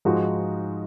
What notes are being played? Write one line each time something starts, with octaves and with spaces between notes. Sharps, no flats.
G#2 F3 G#3 D#4 F#4